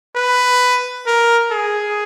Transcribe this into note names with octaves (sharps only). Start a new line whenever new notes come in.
B4
A#4
G#4